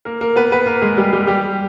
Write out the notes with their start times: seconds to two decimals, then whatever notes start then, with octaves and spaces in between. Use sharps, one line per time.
0.05 A#3 A#4
0.21 A#3 A#4
0.36 B3 B4
0.52 B3 B4
0.66 A#3 A#4
0.81 G#3 G#4
0.97 G3 G4
1.13 G3 G4
1.27 G3 G4